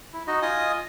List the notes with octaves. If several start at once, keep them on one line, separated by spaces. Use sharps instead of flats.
E4
D#4 F#4 D#5
F4 D#5 G#5 D#6